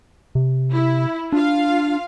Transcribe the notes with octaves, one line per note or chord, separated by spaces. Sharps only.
C3
E4
D4 F4 F5